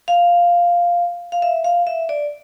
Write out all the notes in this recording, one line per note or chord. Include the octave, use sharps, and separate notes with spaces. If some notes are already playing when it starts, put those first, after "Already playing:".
F5
F5
E5
F5
E5
D5